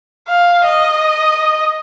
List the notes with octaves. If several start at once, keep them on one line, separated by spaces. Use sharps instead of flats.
F5
D#5